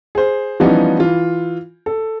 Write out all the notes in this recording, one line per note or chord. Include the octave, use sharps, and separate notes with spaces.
G#4 C5
E3 F3 G3 B3 C#4 D#4
E3 F4
A4